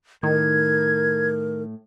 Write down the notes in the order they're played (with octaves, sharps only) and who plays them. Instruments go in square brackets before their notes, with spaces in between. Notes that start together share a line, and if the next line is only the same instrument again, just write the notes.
[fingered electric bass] A2 [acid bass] D#3 [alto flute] A#4 [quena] G#6